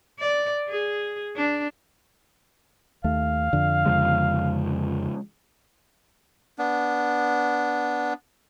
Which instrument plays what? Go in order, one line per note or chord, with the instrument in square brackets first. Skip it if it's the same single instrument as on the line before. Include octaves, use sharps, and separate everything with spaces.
[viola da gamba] D5
G#4
D4
[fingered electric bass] D#2 A3 [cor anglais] F5
[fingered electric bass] F2 D3
[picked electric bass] C#3 F3 G#3
[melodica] B3 D4